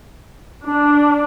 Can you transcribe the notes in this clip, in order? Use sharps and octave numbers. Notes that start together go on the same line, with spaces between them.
D4